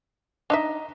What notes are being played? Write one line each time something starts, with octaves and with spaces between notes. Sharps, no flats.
D4 D#4 D#5 E5 A#5